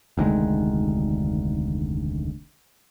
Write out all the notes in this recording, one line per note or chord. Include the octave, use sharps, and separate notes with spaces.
F1 D2 D#3 G#3